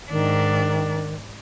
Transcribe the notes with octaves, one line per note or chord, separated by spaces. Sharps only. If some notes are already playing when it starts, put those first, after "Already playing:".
G#2 D#3 D4